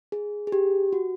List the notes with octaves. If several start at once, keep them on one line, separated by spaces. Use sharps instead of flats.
G#4
G#4
G4
F#4